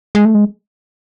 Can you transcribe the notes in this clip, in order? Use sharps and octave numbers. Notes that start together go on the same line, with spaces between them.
G#3
A3
G#3